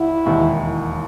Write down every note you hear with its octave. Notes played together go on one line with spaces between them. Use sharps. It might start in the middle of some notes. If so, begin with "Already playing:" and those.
Already playing: D#2 D3 E4
E1 D#2 D#3